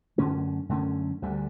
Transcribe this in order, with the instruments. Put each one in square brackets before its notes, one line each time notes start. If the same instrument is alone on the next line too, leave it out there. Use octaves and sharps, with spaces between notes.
[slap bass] F#2 D3 A3 C#4
F#2 D3 A3 C#4
D2 D3 G3